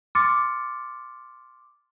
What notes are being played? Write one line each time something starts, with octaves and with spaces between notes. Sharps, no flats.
C6 D6 F6 A6 C#7